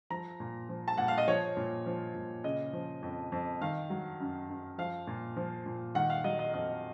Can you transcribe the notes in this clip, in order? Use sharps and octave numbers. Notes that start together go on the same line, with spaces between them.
F3 A#5
A#2
F3
A5
A#2 F#5
F5
D#5
F3 C#5
A#2
F3
A#2
C#3 D#5
F3
F2
F2
D#3 F5
F#3
F#2
F#2
F3 F5
A#2
F3
A#2
D#3 F#5
F5
F#3 D#5
D#5
F2 D#5